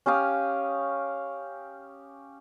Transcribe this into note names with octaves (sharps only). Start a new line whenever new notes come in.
C#4 G4 F5 D#6